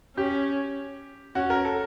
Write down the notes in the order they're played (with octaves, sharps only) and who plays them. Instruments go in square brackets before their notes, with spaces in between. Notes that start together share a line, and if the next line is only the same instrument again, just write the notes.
[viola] C#4 [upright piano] G4
[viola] C#4 [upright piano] F#4
[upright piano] A#4
A4